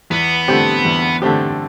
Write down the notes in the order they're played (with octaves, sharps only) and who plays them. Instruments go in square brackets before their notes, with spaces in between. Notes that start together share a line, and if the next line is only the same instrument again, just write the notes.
[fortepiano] E2 [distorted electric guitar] B3
[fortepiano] D3 A3 C4 G4
E2
D3 A3 C4 G4